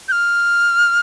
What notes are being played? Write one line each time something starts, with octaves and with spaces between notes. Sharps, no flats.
G6
F6